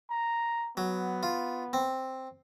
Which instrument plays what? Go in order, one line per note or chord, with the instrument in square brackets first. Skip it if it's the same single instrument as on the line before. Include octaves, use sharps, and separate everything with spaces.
[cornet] A#5
[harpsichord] F#3 [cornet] B3
[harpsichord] F4
C4